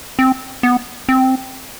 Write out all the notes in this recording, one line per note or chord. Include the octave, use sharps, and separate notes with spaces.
C4
B3
C4